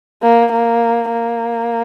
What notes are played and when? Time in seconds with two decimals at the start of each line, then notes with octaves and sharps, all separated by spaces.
0.23 A#3
0.52 A#3
1.12 A#3